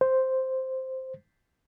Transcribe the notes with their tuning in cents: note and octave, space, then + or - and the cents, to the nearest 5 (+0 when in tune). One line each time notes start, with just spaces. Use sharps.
C5 +0